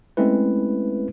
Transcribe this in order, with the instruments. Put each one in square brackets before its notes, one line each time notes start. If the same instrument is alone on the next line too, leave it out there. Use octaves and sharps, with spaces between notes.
[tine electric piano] G#3 A3 C4 C#4 E4 B4